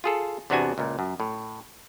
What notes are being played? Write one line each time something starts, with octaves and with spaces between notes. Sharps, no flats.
F4 G#4 A4
E2 C3 B3 D4 F#4 G#5
C#2 A#2
F#2
A2